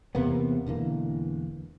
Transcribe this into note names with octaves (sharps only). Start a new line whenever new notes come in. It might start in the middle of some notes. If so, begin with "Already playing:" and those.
E2 C3 A#3 B3
E1 D3 E3 A#3